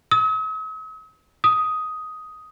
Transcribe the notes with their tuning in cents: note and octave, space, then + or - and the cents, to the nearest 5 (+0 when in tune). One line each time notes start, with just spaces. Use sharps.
D#6 +45
D#6 +10